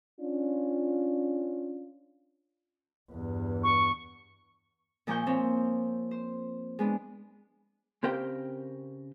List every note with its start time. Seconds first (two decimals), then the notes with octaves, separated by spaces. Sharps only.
0.20 C#4 D4 F4
3.11 E2 G2
3.63 C#6
5.07 A#2 F3 A#3 G#5 C#6 G6
5.26 F3 C4 C#5
6.11 C5
6.79 G#3 B3 D4
8.03 C#3 C4 G4 A#4 F5 G5